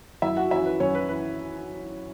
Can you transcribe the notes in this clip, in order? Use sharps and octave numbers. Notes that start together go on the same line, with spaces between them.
F#2 E4 E5
F#4 F#5
E3 C#4 E4 E5
B4
F#2 C#4 C#5
B4
E3 B4